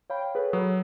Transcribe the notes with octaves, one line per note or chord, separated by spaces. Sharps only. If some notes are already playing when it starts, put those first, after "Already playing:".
C#5 F5 G5 B5
G#4 A4 B4 C#5
F#3 D#6